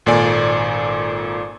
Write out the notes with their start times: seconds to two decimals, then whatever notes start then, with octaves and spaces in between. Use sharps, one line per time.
0.06 G#1 A#2 A4 D5 G#5